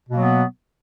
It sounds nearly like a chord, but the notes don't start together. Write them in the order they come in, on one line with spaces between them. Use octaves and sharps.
B2 A#3 F#3 B3